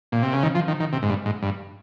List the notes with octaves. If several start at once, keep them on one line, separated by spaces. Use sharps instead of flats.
A#2
C3
C#3
D#3
F3
D#3
D#3
C3
G#2
G2
G#2
G2